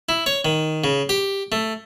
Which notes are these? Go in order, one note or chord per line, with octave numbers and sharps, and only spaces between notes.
E4
C#5
D#3
C#3
G4
A3